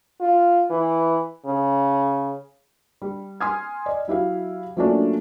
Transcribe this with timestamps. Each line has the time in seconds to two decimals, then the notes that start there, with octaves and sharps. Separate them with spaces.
0.21 F4
0.70 E3
1.46 C#3
3.02 G3
3.41 G#5 C6 D#6 F6 G#6
3.86 D5 D#5
4.07 F#3 E4 G4 F5
4.77 F3 F#3 A3 A#3 C#4 D4